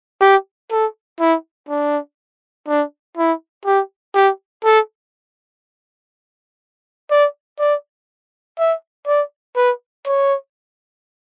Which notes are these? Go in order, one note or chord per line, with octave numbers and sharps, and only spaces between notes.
G4
A4
E4
D4
D4
E4
G4
G4
A4
D5
D5
E5
D5
B4
C#5